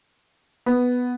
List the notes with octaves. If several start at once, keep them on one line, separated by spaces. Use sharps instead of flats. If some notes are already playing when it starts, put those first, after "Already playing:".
B3